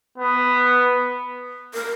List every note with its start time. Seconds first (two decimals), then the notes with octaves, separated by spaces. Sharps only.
0.18 B3
1.74 A#4